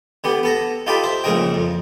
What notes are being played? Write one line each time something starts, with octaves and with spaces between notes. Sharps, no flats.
D3 B3 G4
B3 A4 A#5
D#4 F4 G4 A4 G5 B5
C5 E5
A#1 G#2 C#3 A#4 D#5 G5
F2